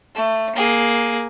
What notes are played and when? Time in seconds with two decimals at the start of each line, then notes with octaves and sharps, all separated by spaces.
0.15 A3
0.55 A#3 G#4